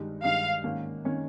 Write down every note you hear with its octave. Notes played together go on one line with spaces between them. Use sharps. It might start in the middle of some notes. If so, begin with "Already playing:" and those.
Already playing: G2 D#3 G#3 D#4 G4
G2 D#3 G#3 D#4 G4 F5
G#2 D#3 A#3 C#4
D#3 A#3 C#4